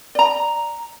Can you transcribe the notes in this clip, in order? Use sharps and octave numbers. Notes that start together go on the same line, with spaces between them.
D5 A#5